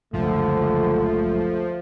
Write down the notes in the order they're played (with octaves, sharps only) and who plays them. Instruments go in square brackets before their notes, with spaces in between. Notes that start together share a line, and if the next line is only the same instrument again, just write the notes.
[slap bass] F#1 C#2 F#2 [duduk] D3 [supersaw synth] F3 [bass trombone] A3